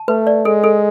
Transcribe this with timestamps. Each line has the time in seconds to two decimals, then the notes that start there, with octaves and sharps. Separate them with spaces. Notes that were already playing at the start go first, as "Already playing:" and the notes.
Already playing: A5
0.08 A3 B4
0.27 D5
0.45 G#3 A4
0.64 A4